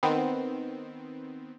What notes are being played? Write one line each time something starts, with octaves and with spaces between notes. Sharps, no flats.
D#3 B3 C4